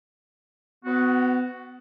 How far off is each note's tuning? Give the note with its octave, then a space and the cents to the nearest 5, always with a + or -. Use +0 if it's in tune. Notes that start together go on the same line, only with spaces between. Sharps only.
B3 +30 F#4 +0